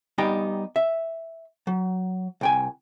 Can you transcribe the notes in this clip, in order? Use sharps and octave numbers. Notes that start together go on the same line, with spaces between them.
G3 B3 D#4 G4 G5 A#5
E5
F#3
C2 G5 G#5